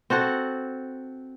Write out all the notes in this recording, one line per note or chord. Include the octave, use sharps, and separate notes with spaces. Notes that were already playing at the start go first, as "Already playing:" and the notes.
C4 F#4 A4 F#5